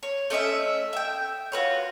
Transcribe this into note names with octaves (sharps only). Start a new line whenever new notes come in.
C#5
A3 C#4 D#5 E5
E5 G5
F4 F#4 B4 C#5